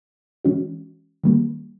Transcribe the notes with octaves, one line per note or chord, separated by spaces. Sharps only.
E3 G#3 C#4 F#4
D#3 G3 A#3